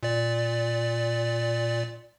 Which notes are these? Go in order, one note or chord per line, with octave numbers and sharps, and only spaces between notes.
A#2 D5